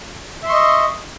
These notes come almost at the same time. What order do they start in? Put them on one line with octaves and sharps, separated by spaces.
E5 C6 C#6 D#5